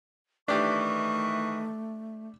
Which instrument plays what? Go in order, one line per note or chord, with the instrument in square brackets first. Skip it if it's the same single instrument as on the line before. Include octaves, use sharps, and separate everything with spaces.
[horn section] D#3 E3 [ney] A3 [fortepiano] D4 G4 [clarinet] C#6